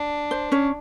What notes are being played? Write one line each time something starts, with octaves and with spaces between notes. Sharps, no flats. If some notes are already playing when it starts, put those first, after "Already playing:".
Already playing: D4
C5
C#4 C#5